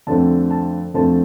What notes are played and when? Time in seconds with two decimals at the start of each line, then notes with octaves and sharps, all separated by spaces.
0.07 F2 D3 A3 C4 A5
0.50 A5
0.94 F2 D3 A3 C4 A5